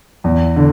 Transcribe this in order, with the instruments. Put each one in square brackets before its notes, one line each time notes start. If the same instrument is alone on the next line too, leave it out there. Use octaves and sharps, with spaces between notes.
[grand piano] E2
D3